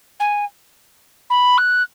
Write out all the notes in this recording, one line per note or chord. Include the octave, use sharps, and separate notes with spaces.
G#5
B5
F#6